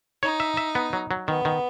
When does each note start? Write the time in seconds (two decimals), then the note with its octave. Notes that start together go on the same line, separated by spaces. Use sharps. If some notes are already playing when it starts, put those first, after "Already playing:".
0.23 D#4 C#5
0.40 E5
0.57 E5
0.75 B3
0.93 F#3
1.11 F#3
1.28 D#3 B3
1.45 D#3